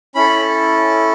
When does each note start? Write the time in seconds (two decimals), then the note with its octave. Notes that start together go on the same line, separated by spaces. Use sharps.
0.15 C#4 E4 A4 B5